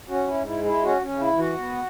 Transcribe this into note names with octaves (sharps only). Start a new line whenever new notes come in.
C#4 F#4
E4
G#2
E4
G#3
E4
C#4 F#4
C#4
C#3
E4
E3
F#4
B3